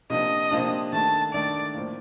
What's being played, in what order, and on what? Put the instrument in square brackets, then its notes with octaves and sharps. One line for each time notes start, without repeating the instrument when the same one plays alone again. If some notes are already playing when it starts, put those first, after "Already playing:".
[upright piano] C3 F3 A#3 D4 [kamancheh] D#5
[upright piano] C3 F3 A#3 D4
[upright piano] D#3 A3 D4 [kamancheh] A5
[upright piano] D#3 A3 D4 [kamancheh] D5
[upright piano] A2 F3 A#3